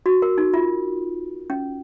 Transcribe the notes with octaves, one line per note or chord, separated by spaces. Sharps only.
F#4
A#4
D#4
F4
C#4